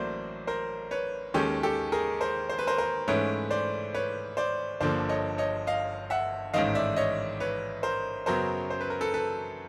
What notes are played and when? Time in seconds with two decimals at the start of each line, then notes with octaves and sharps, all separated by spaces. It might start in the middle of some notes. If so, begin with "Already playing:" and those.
Already playing: A1 A2 F#3 A#3 C5 D5
0.47 A#4 C5
0.91 B4 C#5
1.34 D#2 D#3 G#3 C#4 G4 A4
1.63 G4 A4
1.92 G#4 A#4
2.21 A#4 C5
2.49 C5
2.59 B4
2.67 A#4 C5
2.78 A#4 C5
3.08 G#2 E3 A3 C#4 B4 C#5
3.51 C5 D5
3.94 B4 C#5
4.37 C5 D5
4.80 G1 G2 D3 F3 A#3 C5 D5
5.09 C#5 D#5
5.38 C#5 D#5
5.67 D#5 F5
6.10 E5 F#5
6.54 A1 G#2 D#3 D#5 F5
6.75 D5 E5
6.96 C#5 D#5
7.40 B4 C#5
7.83 A#4 C5
8.26 F#2 C#3 F#3 B3 A#4 C5
8.70 C5
8.81 B4
8.90 A#4
9.01 A4 B4
9.14 A4 B4